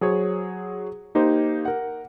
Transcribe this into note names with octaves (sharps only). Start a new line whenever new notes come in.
F#3 G#4 C5 C#5
A#3 D#4 G4 C5
A#4 F#5